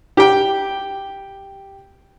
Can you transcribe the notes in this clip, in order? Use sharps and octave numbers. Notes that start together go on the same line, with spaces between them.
G4 G5